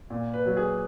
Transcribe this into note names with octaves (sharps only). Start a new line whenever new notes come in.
A#2
B4
F#3
G#4